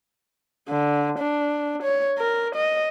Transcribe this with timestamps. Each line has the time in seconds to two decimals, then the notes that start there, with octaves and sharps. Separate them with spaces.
0.68 D3
1.19 D4
1.83 C#5
2.18 A#4
2.55 D#5